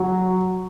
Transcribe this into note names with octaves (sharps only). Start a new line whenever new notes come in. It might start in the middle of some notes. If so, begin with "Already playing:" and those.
Already playing: F#3